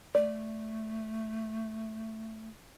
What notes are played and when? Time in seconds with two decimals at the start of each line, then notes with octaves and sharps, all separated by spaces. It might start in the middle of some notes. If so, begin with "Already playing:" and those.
0.15 A3 D5